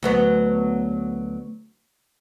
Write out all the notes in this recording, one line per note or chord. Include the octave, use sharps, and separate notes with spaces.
D2 F#3 B3